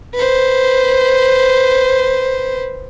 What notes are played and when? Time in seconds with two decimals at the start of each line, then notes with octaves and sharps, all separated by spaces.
0.14 B4 C5